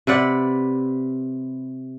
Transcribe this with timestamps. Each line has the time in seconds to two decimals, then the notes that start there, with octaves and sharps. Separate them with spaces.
0.07 C3 B4 D5 F#5